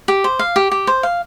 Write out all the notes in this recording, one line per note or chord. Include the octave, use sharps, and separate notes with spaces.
G4
C5
F5
G4
G4
C5
F5